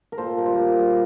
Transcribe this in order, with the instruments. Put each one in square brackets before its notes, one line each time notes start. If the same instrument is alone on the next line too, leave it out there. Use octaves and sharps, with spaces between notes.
[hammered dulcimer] A#4
A#2 A4 C5
G3 A#4
C5
A#2 G4 A#4
G3